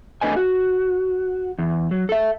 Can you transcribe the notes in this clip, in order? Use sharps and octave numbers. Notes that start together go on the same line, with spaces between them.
A3 D4 B4 D#5 G#5
F#4
E2
F#3
A4 E5